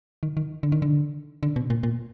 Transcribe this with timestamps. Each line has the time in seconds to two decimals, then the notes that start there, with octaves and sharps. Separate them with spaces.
0.23 D#3
0.37 D#3
0.63 D3
0.72 D#3
0.82 D3
1.43 D3
1.56 B2
1.70 A#2
1.83 A#2